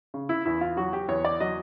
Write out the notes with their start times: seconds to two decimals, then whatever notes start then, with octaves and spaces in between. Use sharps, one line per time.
0.14 C#3
0.29 E4
0.45 E2 E4
0.61 F4
0.77 F#3 F#4
0.93 G4
1.08 E2 C#5
1.25 D5
1.40 F#3 D#5